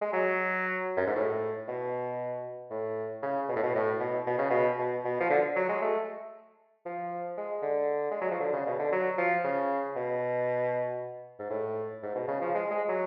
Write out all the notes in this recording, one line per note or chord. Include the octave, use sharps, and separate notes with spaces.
G#3
F#3
F#2
G#2
A2
B2
A2
C#3
B2
A2
B2
A2
B2
B2
C#3
B2
B2
B2
F3
D3
F#3
G#3
A3
F3
G#3
D3
G#3
F#3
F3
D3
C#3
B2
D3
F#3
F3
C#3
B2
G#2
A2
G#2
B2
C#3
F3
G#3
G#3
F#3